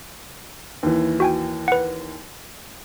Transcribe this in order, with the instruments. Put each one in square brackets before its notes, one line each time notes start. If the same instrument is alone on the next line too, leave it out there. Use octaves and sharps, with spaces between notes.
[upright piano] D#2 E3
[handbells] F#4 G5 G#5
B4 F#5